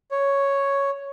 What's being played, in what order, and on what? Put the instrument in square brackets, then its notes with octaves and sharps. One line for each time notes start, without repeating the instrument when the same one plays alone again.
[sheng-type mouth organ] C#5